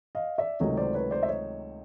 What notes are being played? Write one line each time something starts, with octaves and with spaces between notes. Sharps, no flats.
D#5 F5
D5 E5
C#2 C3 D#3 F#3 A3 C#5 D#5
C5 D5
B4 C#5
C5 D5
E5
C#5 D#5